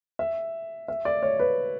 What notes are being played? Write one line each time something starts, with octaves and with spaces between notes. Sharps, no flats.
E5
E5
D5
C#5
B4